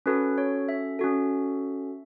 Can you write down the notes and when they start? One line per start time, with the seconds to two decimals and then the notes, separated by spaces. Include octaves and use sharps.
0.06 C#4 F#4 A4 B4
0.38 C#5
0.69 E5
0.99 C#4 F#4 A4